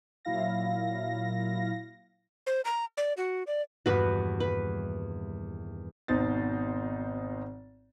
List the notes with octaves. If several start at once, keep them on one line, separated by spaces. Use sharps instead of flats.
A#2 F#3 E4 F5 A#6
C5
A#5
D5
F#4
D5
D#1 E2 G2 F#4 B4
B4
G#1 B2 D#4 C5 A6